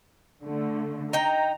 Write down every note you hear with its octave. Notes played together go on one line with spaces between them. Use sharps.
D3 A3
D#4 G5 A#5